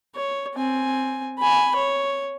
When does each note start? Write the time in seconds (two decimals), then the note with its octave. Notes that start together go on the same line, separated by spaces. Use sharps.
0.15 C#5
0.55 C4 G#5
1.39 G#5 B5
1.76 C#5